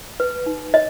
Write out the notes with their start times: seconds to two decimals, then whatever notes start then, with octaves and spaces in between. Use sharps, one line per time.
0.20 B4
0.46 D#4
0.74 C#5 D#5